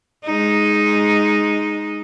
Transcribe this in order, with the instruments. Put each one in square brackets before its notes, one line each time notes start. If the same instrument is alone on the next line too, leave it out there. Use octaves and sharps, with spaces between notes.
[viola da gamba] G#3 D#4